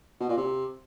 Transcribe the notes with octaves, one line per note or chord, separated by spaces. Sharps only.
B2
A#2
C3